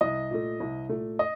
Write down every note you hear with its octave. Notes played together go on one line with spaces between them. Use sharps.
C2 D#5
A#2 A3
C2
A#2 A3
D#5